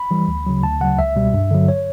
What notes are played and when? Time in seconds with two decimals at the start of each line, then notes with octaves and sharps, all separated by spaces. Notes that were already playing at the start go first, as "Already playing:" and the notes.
Already playing: B5
0.11 E3 G3
0.28 D2
0.47 C#3 F#3
0.63 D2 A5
0.81 C#3 F#3 F#5
0.98 C#2 E5
1.16 B2 G3
1.34 G2
1.51 D3 F#3
1.68 C#5